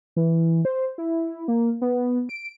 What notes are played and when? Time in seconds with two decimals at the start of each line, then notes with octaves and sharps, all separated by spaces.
0.16 E3
0.65 C5
0.98 E4
1.48 A#3
1.81 B3
2.29 D7